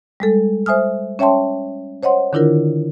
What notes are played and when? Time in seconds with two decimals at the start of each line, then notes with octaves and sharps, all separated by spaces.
0.20 G3 G#3 A4
0.66 C5 E5 G#5 D#6 F6
1.19 C#4 C#5 E5 G5 A5 C6
2.03 C5 C#5 D#5 F#5 C6
2.33 D3 D#3 D4 E4 F4 A#4